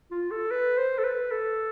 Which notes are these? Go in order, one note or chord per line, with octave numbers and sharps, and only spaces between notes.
F4
A4
B4
C5
A4
B4
A4